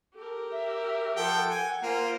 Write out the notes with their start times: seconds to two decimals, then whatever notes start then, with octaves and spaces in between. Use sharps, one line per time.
0.15 G4 A4 A#4
0.52 E5
1.16 F3 A4 F#5 G5
1.50 G#5
1.83 A#3 F4 C5